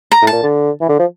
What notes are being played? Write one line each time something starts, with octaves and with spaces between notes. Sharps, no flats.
A#5
A2
A5
A#2
D3
E3
D3
F3